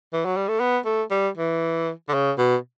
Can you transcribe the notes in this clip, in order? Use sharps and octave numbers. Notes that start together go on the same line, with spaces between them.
E3
F#3
G3
A3
B3
A3
G3
E3
D3
C#3
B2